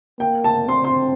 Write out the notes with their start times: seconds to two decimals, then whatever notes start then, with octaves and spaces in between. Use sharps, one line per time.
0.19 A#3 G5
0.44 A5
0.68 C4 C6
0.84 C6